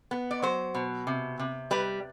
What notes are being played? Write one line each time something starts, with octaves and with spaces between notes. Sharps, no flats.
B3
D5
F#3 C5
B2
C3
C3
G3 B4